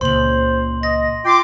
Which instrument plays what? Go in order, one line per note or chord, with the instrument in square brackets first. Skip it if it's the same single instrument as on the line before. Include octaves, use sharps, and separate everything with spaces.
[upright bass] C#2 A#2 [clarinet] C5 [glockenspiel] C6 F#7
[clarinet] D#5 [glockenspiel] A#6
[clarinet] F4 [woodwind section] G5 C6 D6